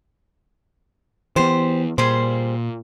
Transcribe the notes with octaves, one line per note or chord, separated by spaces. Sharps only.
E3 B3 G4 C5
A#2 G3 G#4 C5